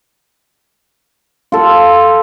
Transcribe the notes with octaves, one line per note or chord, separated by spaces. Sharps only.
F4 A4